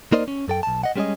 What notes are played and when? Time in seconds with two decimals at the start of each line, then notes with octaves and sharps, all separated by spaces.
0.12 A#3 D#4 A#4 C5 D5 D#5
0.28 C#4
0.48 F#2 A4 G5
0.63 B1 A5
0.83 D#5 F#5
0.96 G3 G#3 C#4 F4 G#4 D#5